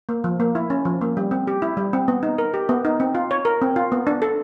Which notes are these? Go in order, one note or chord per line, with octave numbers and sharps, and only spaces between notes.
A#3
F3
A#3
E4
C#4
F3
A#3
G3
C4
G4
E4
G3
C4
B3
D#4
A#4
G4
B3
D#4
C4
F4
C#5
A#4
C4
F4
B3
D4
A4